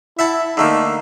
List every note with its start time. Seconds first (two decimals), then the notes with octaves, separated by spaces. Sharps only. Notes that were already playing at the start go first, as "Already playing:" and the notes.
0.19 E4 E5 F#5 A5
0.57 D3 A3 A#3 D#4